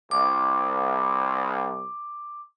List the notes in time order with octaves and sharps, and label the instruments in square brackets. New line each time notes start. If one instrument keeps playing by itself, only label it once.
[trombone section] C2 [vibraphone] D6